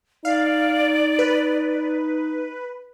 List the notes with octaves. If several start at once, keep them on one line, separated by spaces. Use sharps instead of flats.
D#4 D5 F5
B4